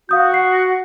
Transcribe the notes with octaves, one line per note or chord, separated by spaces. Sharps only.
F#4 F5 D#6 G6
F#5 C7